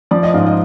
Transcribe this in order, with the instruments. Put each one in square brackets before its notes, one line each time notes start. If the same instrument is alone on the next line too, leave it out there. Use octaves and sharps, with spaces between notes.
[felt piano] F3 D5
D#5
G#2 F5
D#5